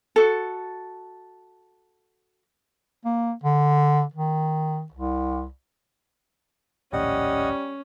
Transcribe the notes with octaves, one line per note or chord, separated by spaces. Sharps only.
F#4 A4
A#3
D3
D#3
C2
A#1 D#2 A2 G3 C#4 D#5 F#5